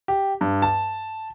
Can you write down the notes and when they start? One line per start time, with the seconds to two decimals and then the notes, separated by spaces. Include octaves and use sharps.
0.08 G4
0.41 G2
0.62 A5